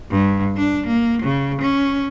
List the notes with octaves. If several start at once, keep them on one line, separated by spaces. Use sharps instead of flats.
G2
D4
A#3
C#3
C#4